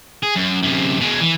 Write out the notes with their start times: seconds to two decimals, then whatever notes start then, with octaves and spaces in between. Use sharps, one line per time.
0.23 G#4
0.36 F#2
0.63 F#2 C3
1.00 B2 G#3
1.20 E3